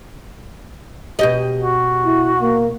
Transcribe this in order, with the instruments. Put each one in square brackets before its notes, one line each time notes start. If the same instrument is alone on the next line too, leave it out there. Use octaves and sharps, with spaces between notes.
[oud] B2 G4 D#5
[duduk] F#4
[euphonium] E4
A#3